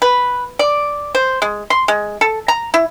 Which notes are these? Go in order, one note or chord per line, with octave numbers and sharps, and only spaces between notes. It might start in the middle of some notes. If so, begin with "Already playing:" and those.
B4
D5
C5
G#3
C6
G#3
A4
A#5
E4